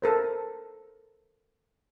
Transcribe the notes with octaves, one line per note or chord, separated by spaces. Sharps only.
A4 A#4 C5